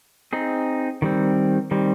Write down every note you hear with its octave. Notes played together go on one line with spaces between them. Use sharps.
C4 D#4 G#4
D#3 G3 C4
D#3 G3 C4